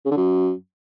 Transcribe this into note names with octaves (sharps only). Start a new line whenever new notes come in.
C#3
D3
F#2